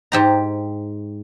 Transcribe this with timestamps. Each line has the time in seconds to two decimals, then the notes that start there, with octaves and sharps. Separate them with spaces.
0.12 G#2 G4 A#5